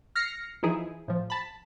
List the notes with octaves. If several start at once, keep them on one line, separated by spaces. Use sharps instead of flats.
F6 A#6 C7 C#7
E3 F3 D#4 E4 G#4
A2 F3
A5 B5